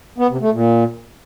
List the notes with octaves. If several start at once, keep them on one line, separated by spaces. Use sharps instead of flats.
B3
C3
A3
A#2